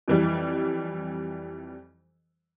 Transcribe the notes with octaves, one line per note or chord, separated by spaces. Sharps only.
F2 E3 G3